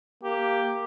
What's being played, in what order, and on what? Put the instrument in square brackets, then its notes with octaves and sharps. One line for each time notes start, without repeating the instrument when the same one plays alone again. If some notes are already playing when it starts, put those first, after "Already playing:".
[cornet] A#3 [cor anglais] G4